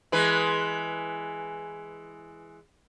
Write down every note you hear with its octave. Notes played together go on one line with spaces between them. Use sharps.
E3 G#3 B4